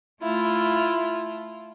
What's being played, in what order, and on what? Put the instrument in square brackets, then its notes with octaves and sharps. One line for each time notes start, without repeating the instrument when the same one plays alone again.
[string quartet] A3 E4 F4